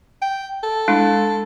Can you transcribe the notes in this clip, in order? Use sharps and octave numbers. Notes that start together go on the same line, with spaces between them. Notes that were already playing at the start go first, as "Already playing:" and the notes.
G5
A4
G#3 D4 E4